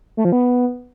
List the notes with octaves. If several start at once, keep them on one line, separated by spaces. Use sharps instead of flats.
A3
F3
B3